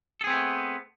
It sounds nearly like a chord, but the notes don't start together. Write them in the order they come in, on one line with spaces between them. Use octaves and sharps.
A4 G#4 C4 B3 A3